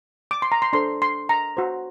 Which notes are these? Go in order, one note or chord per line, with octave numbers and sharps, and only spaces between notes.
D6
C6
A#5
C6
D4 A4 C5 C6
C6
A#5
F#4 C5